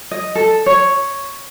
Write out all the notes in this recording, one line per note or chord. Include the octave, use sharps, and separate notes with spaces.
D#5
A4
C#5